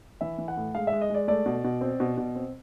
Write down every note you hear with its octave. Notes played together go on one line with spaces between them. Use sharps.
E3 E5
E3
F#5
A2
G#3 F5
E5
G#3
D#5
G#3 D5
A3 D5
B2
B2
C4
B2
B2
C4